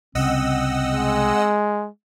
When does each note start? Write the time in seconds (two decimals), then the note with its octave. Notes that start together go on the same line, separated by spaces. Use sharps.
0.15 C2 C#3 C4 D#5 F#5 E6
0.91 G#3